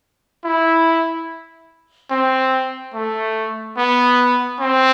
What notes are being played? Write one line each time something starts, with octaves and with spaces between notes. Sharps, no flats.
E4
C4
A3
B3
C4